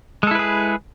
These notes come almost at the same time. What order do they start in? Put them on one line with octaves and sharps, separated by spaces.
G#3 A4 E4 B4 G#4